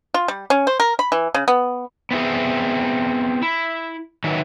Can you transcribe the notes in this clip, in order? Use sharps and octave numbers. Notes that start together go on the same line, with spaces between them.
F4
G3
C#4
C5
A#4
B5
E3
C#3
B3
B3 C4 E4 G#4
E4
D#3 E3 F#3